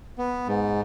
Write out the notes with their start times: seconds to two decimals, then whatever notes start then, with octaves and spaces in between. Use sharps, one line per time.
0.18 B3
0.48 G#2